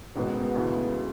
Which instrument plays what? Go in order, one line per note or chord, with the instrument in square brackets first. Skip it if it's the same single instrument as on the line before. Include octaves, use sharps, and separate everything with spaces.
[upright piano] A1 G#2 D#3 G#3 B3 [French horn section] B2
[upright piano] D2 C#3 E3 G#3 B3